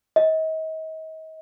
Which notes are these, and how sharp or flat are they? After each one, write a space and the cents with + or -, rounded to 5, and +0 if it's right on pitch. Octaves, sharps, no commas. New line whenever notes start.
D#5 +40